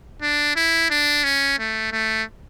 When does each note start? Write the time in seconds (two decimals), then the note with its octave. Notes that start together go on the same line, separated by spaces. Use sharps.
0.22 D4
0.56 E4
0.90 D4
1.24 C#4
1.59 A3
1.92 A3